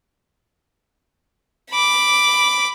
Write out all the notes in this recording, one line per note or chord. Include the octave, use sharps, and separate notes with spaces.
B5 D6